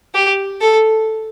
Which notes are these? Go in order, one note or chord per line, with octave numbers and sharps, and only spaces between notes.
G4
A4